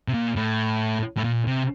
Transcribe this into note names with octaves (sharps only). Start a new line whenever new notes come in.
C3
A#2
A2
A2
A#2
C3